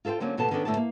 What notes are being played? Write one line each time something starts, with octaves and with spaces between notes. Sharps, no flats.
F4 A4 B4 C5 G5
D3 F#3 A#3 C4 C#4
D#2 B2 B3 A4 A5
D#3 B3 C#4 D4 A4
A2 D3 A3 B3 G4 A5
A#3